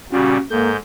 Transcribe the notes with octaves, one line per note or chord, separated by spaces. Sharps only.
A#2 C#3 G3 C#4 F#4
G#2 A#3 A4 G6